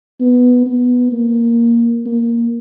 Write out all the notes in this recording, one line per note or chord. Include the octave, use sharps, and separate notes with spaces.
B3
B3
A#3
A#3